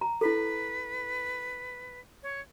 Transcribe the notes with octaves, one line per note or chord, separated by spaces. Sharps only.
A#5
E4 A4 B4
C#5